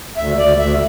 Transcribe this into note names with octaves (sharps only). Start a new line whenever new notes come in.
D2 E5
D2 D5
D2 E5